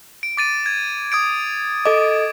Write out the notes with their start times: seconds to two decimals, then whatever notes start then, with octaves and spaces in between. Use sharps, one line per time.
0.23 D7
0.37 D6 A6 D#7
0.66 G#6
1.12 D#6 G#6 D7
1.85 A4 D#5 D6